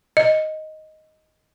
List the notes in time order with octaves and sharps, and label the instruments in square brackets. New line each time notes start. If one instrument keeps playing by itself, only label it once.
[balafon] D#5